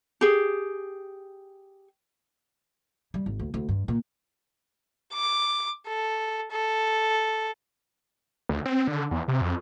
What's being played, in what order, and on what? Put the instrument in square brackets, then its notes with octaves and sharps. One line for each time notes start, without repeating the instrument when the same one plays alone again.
[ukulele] G4 G#4
[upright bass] G3
G#1
D2
D2
G2
A#2
[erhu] D6
A4
A4
[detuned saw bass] D2
C4
D3
E2
C3
F2